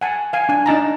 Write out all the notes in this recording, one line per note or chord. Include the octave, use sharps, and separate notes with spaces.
F#5 G#5 A5
F5 G#5
D4 G#5
D4 D#4 A5 A#5